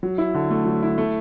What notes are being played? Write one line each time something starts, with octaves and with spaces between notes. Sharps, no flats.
F#3
E4
D3
A3
F#3
E4
A3